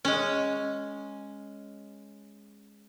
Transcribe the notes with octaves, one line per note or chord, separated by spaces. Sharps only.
G#3 C#4